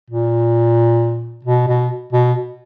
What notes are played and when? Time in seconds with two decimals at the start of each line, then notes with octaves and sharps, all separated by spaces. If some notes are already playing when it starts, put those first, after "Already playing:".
0.10 A#2
1.45 B2
1.68 B2
2.13 B2